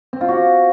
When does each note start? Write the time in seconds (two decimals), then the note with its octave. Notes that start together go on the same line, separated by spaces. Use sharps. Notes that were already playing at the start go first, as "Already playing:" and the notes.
0.13 C4
0.21 F4
0.28 F#4